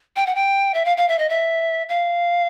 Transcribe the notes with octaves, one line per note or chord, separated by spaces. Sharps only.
G5
F#5
G5
E5
F5
F5
E5
D#5
E5
F5